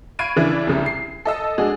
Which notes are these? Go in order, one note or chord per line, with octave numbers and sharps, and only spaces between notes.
F5 B5 C#6 G#6 D7 D#7
C#3 E3 D4 E4
C2 C#3 G3
C7
A4 D#5 E6
G#3 D4 F#4 G#4